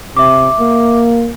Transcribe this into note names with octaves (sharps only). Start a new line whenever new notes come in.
C3 E5 D6
A#3